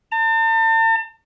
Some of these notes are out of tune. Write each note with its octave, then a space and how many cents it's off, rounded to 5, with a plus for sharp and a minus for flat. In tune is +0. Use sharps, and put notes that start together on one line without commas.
A5 +40